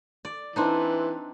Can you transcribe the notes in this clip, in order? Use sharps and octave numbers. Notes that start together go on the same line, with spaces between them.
D5
E3 C4 D4 D#4